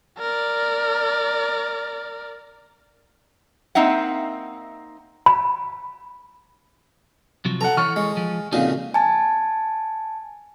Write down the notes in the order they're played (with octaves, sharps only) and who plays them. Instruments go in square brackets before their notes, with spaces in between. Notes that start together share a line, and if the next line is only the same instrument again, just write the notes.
[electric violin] A#4 D5
[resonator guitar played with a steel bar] A#3 C4 D#4 E5 F#5
[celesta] B5
[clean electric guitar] C3 F3 F#3
[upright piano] A4 F#5 [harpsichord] A#5
[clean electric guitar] E3 A4 C#5 [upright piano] C#6 F6
[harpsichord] G#3
[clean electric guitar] F3
[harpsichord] F2 A#2 C#3 [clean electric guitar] D#4 F#4 G#4
[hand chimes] G#5 A5